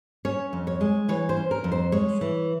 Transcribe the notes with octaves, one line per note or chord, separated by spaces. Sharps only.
C#4 C#5
F2
C#5
G#3
E3 C#5
C5
C#4
A#4
F2
C5
G#3 C#5
E3